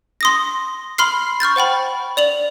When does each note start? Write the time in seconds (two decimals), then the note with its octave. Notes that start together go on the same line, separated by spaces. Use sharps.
0.21 C6 D#6 A#6
0.98 B5 C6 F6 C7
1.40 C#6 F6 G6 A6
1.56 C5 F#5 G5 B5
2.17 D5 F7 F#7